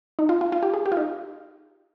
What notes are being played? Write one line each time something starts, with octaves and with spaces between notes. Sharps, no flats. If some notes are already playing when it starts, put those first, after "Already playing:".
D#4
F4
F4
F4
G4
G#4
G4
F4
D#4